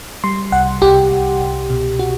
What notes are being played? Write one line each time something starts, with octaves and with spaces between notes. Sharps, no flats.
G3 C6
C2 F#5
C2 G4
C2
C2
B2
F#4